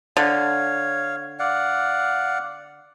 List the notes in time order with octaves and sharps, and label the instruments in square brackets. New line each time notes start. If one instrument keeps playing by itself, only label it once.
[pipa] D3 [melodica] C#5 F5
[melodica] D5 F5 F#5